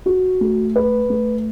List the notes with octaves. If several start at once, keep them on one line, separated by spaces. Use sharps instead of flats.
F#4
A3
B4
A3